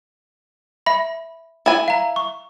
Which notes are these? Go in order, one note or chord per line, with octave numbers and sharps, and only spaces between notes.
E5 B5
E4 G#5
F5 A#5
C#6